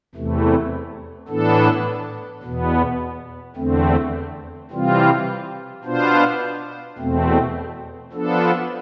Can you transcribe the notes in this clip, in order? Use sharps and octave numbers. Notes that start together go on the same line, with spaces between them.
E2 C3 E3 A3
A2 E3 B3 D4 A4
E2 B2 B3
E2 D3 A3 C4
C3 E3 G3 C4 F4
B2 B3 D4 F4 C5
E2 B2 A3 C4
F3 B3 D4 A4